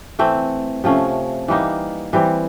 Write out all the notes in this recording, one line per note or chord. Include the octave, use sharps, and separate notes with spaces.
E3 A3 C4
C3 F3 A3 C#4
E3 G3 A#3 D#4
E3 G3 C4